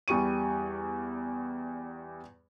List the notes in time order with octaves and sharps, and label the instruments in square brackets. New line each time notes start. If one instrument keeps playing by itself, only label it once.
[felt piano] E2 G3 C#6 D#7